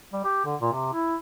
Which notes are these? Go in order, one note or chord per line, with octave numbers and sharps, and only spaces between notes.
G3
G4
D3
A#2
C3
E4